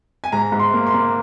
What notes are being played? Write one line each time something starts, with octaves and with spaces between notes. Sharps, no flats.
G#5
G#2 A#5
G#2
C6
A#3
C6
A#3